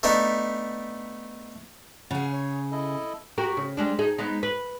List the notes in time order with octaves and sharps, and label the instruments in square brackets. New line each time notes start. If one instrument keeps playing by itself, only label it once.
[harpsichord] A3 B3 D4 D#4
[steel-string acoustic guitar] C#3 G#4 [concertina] F#5
[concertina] C#5
E4 A4 D#5
[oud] F#4 G4 A#4
C#3
G3 G#3 D4
D#4 G#4
G#3 B3 D#4
B4